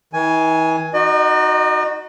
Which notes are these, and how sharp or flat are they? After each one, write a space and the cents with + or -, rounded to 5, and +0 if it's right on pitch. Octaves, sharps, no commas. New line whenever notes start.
E3 -40 G#5 +5
D#4 +0 F#4 +0 D#5 -45